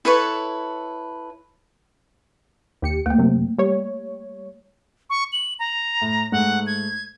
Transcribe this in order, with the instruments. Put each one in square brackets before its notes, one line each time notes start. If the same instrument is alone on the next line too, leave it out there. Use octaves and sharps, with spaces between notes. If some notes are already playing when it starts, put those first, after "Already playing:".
[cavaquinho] E4 A4 B4 C#5
[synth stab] D#2 G4 C#7
[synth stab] D2 [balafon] A3 A#3
[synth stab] F#2 C3
G3 C#5
[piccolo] C#6
F#7
A#5
[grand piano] A2
[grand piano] G#2 A3 [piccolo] F#5
[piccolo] G#6